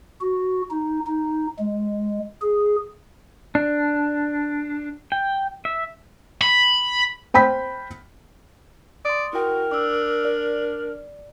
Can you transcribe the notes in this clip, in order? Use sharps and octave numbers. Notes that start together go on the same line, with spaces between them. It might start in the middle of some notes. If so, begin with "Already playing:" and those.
F#4
D#4
D#4
G#3
G#4
D4
G5
E5
B5
C5 G5 B5 B6
D5 C6 D#6
E4 F#4 A#4 G5
D4 D6 E6
D5